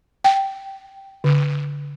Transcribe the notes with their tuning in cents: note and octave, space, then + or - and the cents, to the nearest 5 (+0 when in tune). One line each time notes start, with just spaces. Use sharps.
G5 -5
D3 -30